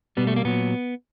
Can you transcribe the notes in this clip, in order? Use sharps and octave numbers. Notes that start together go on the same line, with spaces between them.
B2 G3 B3
A3
A#3
A#2 F#3 B3